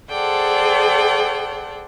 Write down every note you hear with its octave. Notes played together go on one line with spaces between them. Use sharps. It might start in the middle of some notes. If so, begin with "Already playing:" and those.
G#4 A4 C5 D5 F#5 G5